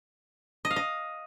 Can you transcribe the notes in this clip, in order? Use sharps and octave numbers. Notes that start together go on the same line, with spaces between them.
D#5
F5
D#5